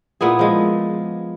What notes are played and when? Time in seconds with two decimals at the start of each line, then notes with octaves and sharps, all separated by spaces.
0.21 A#2 B3 E4 G#4
0.39 F3 G#3